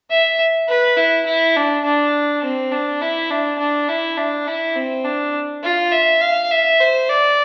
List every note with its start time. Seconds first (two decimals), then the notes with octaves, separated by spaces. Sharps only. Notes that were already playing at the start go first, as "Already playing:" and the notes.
0.11 E5
0.69 B4
0.97 E4
1.26 E4
1.56 D4
1.84 D4
2.44 C4
2.72 D4
3.01 E4
3.30 D4
3.59 D4
3.88 E4
4.17 D4
4.47 E4
4.76 C4
5.04 D4
5.63 F4
5.92 E5
6.21 F5
6.51 E5
6.80 C5
7.09 D5